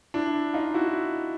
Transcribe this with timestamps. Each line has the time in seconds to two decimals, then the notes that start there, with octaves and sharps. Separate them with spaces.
0.14 D4 E4
0.54 D#4 F4
0.74 E4 F#4